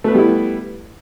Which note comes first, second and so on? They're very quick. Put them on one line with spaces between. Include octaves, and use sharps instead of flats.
A3 B4 B3 G3 E4